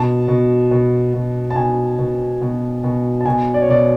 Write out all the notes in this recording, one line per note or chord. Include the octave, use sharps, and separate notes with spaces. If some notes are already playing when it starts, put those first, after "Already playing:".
Already playing: B2 A5
B2
B2
B2
A5
B2 G#5
B2
B2
B2
A5
B2 G#5
D5
C#5
B2 D5